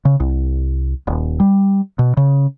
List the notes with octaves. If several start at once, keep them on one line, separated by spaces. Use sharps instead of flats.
C#3
C2
D#1
G3
B2
C#3